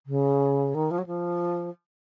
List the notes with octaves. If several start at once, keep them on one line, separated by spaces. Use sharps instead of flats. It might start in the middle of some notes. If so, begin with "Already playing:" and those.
C#3
D#3
F3
F#3
F3